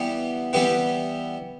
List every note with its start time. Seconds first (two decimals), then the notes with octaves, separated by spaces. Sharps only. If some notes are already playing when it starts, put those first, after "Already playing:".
Already playing: E3 G3 B3 E4 G4
0.53 E3 G3 B3 E4 G4 B4